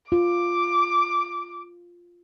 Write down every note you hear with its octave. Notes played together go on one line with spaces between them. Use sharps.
F4 D6